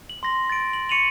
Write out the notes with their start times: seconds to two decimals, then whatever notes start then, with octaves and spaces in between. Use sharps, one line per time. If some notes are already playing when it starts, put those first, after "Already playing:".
0.10 F#7
0.23 C6 A#6
0.50 A6 D7
0.73 F#7
0.89 C#6 C#7 D#7 F7 F#7